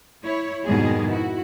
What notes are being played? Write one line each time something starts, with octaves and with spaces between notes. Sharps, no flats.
E4 C#5
F2 G#2 B2 D#3 G3 G#4
E4 F#4